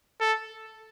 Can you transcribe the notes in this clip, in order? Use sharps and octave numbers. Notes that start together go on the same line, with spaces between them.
A4